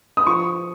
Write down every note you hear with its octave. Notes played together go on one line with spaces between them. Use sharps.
D#6
F3 C#6